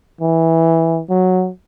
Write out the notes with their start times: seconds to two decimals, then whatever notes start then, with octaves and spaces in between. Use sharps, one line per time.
0.21 E3
1.09 F#3